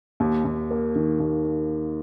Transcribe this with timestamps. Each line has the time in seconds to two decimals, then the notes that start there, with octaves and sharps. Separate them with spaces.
0.20 D#2
0.45 D#2
0.71 A#3
0.95 D#3
1.20 D#2